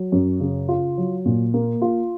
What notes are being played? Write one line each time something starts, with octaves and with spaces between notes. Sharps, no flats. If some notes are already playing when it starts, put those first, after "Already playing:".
Already playing: F#3
F#2
C#3
F4
F#3
A#2
A#3
F4